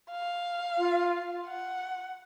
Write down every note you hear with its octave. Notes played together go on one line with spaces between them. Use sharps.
F5
F4
F#5